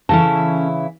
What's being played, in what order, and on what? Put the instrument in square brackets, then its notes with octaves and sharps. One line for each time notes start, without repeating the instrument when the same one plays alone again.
[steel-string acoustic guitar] C#3 E3 E4 [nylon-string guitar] C#4 A4 A5